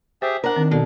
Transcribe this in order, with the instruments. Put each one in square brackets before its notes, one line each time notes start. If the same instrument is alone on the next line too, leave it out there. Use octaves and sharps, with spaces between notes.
[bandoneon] G4 G#4 E5 [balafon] C5
[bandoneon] D4 [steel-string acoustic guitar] A#4 F#5
[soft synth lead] D#3 [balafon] C4
[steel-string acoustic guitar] B2 [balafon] A4 D5